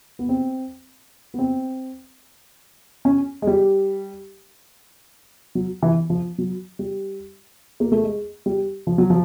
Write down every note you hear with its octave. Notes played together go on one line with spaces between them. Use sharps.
B3
C4
B3
C4
C#4
G#3
G3
F#3
E3
F3
F#3
G3
A#3
A3
G#3
G3
F3
F#3
F3